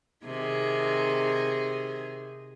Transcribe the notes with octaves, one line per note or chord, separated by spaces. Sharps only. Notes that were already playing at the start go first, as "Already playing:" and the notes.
C3 D#3 G#4